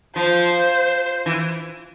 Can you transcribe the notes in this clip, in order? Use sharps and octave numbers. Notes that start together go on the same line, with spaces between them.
F3 C5
E3